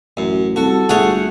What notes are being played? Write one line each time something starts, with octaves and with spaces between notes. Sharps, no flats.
A1 F#2
C2 F#4 A4
G1 A3 F#4 G#4 C#5 F#5